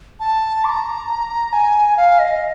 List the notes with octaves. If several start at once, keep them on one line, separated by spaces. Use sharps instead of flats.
A5
D6
A#5
G#5
F5
D#5